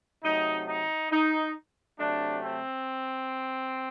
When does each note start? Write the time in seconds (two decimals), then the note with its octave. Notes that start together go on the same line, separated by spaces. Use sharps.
0.24 C3 F#3 A3 D#4
0.68 D#4
1.12 D#4
1.99 C3 F#3 A3 D4
2.44 C4